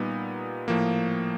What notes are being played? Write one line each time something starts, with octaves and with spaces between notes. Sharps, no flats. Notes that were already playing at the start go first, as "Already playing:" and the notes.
Already playing: A#2 G3 B3 D#4
A2 F3 A#3